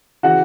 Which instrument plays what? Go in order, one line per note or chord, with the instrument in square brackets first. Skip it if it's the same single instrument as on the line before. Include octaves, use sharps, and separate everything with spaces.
[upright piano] C#3 E3 F#4 F#5